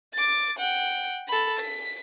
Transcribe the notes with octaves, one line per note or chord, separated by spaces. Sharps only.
D6 A6
F#5 G5
A4 B5
B6